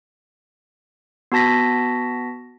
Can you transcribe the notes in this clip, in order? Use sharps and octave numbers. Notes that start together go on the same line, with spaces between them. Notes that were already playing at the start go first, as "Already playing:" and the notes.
B3 F#4 A5 A#6 B6